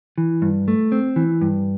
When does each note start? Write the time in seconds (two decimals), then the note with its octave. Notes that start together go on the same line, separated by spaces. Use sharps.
0.18 E3
0.42 G2
0.68 A3
0.92 C4
1.16 E3
1.41 G2